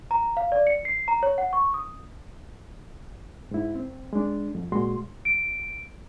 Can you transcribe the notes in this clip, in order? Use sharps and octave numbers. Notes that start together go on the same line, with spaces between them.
A#5
F5
D5
C#7
C7
A#5
C#5
F#5
C#6
D#6
G#2 E4
C4
G#3 D4
F2
A#2 G#3 F#4 C6
D7